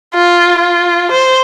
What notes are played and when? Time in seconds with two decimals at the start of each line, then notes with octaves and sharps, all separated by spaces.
0.14 F4
0.59 F4
1.11 C5